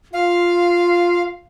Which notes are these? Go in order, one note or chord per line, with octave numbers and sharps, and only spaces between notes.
F4 F5